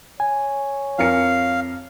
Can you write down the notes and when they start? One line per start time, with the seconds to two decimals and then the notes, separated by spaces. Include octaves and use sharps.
0.20 C#5 G#5
0.98 F2 A#4 F5 C#7